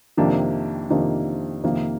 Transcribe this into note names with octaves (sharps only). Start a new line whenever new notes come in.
F2 C3 D#3 A#3 D4
F2 C3 D#3 A#3 D4
F2 C3 D#3 A#3